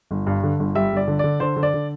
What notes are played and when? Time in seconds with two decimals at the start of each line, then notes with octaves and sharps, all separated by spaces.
0.11 G1
0.27 G2
0.43 D3
0.59 G1
0.75 G3 E5
0.92 G1 D5
1.08 D3
1.19 D3 D5
1.40 D3 C5
1.56 D3
1.63 D5
1.74 D3